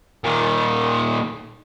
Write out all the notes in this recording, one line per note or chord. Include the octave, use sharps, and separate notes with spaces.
A#2 D#3